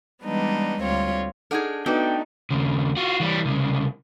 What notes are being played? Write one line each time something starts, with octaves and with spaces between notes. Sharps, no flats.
E3 G3 G#3 B3 D4 D#4
D2 G3 C4 F4 C#5
D4 D#4 G#4 A4 F#5
A3 B3 D4 D#4 F#4 B4 G5
D#2 C#3
F4 F#4
E3 G3
C2 C#3